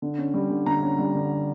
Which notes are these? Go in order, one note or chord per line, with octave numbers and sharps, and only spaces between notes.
D3
C#4
G3
D3
D3 A#5
C#4
G3
D3